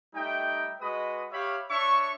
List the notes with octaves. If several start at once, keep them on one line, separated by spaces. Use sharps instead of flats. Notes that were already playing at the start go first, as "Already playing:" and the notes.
G3 A3 D#4 E5 G5
G#3 F#4 B4 D#5 B5 D#6
G4 C#5 E5 F5 B5
D4 C#5 E5 C#6